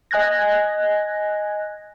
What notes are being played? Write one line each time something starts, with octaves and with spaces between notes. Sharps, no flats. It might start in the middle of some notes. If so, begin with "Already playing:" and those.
D#5 G#5 F#6 G#6 A#6